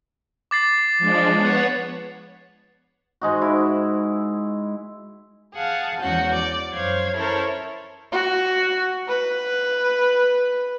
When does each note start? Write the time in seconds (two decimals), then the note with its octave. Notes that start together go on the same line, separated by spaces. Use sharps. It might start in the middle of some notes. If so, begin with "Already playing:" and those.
0.51 D6 A6 C7
0.98 F3 G#3 D4
1.34 B3 C#5 F#5
3.21 G#2 G#3 D#4 F#4
3.42 E4
5.54 G#4 F5 F#5 A5
5.99 E2 F3 G#3 C#4 F#4 G6
6.35 D5
6.74 F#2 C5 C#5 F5 G#6
7.15 C#4 E4 A4 A#4 C5 C#5
8.12 F#4
9.08 B4